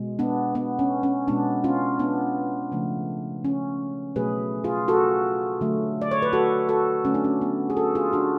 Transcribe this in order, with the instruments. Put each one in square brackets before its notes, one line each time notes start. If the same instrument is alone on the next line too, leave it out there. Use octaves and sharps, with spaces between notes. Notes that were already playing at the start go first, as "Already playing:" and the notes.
Already playing: [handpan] B2 G#3
B3 D4
B3
C#4
C#4
B2 G#3 B3 D4
C#4 F4
B3 D4
C#3 F3 A3
C#4
B2 F#3 A3 G#4 B4
F4 G#4
F#4 A4
D3 F#3 A3
D5
C#5
B4
F#4 A4
F#4 A4
D3 F#3 A3 C#4
D4
C#4
B3
G#4
F#4 A4
F4 G#4
D4 F#4